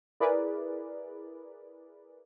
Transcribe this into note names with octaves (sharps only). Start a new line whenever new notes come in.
E4 G#4 A#4 B4 D5